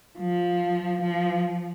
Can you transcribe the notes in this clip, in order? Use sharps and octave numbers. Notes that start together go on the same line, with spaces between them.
F3
F3